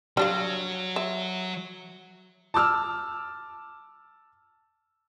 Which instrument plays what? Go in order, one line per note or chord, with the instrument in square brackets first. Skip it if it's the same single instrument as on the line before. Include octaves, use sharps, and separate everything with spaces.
[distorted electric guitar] F#3 [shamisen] G3 D4 F5
[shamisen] E5
[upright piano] A5 D6 E6 F6